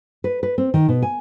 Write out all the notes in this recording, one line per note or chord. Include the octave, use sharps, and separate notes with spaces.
B4
B4
C4
D#3
B2
G#5